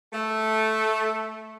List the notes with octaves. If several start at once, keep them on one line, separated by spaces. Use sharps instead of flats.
A3